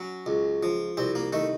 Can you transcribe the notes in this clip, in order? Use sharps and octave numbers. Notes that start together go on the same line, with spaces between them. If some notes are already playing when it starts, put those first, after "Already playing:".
Already playing: F#3 C#4
C#2
F3
C2 C4
A#3
D#3 A3